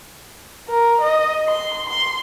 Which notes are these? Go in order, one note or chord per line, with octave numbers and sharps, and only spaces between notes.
A#4
D#5
C6
C6